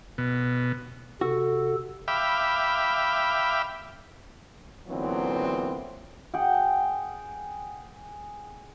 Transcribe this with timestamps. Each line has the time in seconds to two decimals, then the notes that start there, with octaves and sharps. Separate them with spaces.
0.18 B2
1.21 C3 F#4 A4
2.08 E5 F5 G5 B5 D6
4.88 A#2 D3 E3 F#3 B3 C4
6.34 G#4 F#5 G5